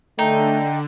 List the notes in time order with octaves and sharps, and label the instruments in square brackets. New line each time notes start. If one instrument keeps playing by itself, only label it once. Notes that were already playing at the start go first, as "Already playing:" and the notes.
[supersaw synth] D3 [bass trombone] A3 [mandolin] D#4 [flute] G5